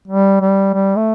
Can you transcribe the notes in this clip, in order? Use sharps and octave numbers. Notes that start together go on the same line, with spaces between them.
G3
G3
G3
A3